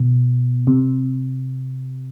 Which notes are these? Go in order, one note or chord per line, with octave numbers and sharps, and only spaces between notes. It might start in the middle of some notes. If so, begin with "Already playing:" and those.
Already playing: B2
C3